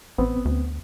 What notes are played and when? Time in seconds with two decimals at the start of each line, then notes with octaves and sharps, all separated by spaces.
0.18 A1 B3 C4
0.45 D2